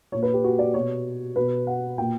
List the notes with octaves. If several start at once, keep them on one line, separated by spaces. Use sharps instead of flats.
A#2 C#5
B4
G4
F#4
D5
B2 C#5
B2 B4
F#5
A#2 G5